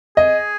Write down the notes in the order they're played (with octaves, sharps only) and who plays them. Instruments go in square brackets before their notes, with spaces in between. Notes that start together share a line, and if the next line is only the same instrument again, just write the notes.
[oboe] G#4 [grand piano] D#5